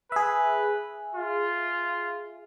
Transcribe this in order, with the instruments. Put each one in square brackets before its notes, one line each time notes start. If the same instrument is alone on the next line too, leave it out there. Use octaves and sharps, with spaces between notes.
[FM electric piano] G#4 E5 [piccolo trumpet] B4
[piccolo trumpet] F4